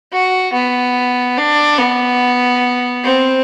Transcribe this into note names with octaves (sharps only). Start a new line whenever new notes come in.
F#4
B3
D4
B3
C4